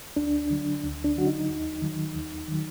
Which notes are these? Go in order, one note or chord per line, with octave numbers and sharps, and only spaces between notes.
D2 D4
D3 F#3
D2
D4
D3 F#3 F#4
D#4
D#2
D#3 F#3
D#2
D#3 F#3